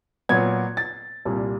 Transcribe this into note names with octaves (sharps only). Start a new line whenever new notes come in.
A#2 F#3 B3 G#6
A6
C2 A#2 G3